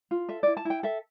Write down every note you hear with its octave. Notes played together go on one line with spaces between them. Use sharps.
F4
A4 E5
E4 D5
A5
E4 G5
A4 E5